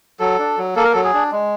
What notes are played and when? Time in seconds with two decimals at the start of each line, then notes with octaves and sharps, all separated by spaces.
0.20 F#3 A4
0.39 D4
0.57 F#3
0.76 A#3 A4
0.84 A#4
0.93 F#3 A4
1.04 G#4
1.14 D4
1.32 G#3